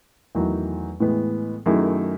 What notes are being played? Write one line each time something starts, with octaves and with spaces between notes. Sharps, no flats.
E2 D#3 F#3 A3 E4
A2 E3 G#3 B3
F#2 D#3 A3 E4 G#4